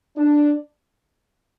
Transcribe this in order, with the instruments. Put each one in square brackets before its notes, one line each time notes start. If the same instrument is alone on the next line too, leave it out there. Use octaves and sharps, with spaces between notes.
[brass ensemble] D4